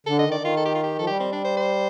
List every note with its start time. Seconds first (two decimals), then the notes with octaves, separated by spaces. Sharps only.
0.06 D3 A4
0.19 D#3 D#5
0.32 D5
0.40 D#3 F4
0.57 A4
0.65 G4
0.75 F4
0.84 G4
0.98 F3 A4
1.07 G3 G4
1.20 C4
1.32 D4
1.44 C5
1.57 C5